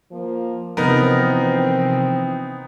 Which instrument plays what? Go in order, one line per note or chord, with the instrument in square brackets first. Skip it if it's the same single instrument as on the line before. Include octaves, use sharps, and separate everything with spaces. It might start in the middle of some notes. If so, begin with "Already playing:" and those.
[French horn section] F3 A#3
[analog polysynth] C3 F3 [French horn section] E3 C4 [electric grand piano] B3 D#4 [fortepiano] A#4